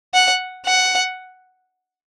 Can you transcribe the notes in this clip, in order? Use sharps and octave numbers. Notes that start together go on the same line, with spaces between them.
F#5
F#5